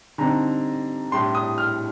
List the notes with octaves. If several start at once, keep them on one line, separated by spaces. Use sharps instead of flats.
D3 G3 C4 D#4 A#5
A2 G3 D4 C6
D#6
F6